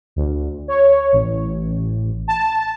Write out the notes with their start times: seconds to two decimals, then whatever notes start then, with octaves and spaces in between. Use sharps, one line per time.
0.16 D2
0.68 C#5
1.12 A1
2.28 A5